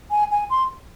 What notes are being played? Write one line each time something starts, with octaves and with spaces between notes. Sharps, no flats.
G#5
G#5
C6